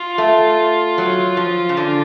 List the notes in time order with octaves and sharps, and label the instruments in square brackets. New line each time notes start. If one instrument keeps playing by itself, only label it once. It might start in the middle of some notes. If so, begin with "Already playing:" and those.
Already playing: [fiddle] F4
[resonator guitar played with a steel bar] A3
F#3
F3
C#3
D3